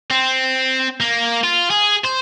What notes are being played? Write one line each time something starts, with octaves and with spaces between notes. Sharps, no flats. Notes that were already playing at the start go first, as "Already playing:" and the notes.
C4
A#3
F4
G#4
C5